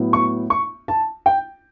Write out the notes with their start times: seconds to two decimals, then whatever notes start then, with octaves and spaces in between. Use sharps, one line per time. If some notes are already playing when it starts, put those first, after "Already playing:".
Already playing: A2 F#3 B3
0.13 C#6
0.50 C#6
0.88 A5
1.26 G5